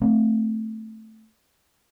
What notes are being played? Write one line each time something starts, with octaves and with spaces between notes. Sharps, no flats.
A3 C4